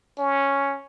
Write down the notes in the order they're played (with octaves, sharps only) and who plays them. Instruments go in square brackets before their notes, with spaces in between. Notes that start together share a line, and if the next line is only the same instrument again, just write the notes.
[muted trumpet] C#4